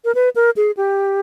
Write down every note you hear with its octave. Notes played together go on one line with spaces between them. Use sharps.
A#4
B4
A#4
G#4
G4